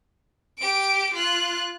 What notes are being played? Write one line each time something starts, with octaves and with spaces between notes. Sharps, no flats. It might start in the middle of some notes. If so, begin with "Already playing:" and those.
G4 D7
F4 F#6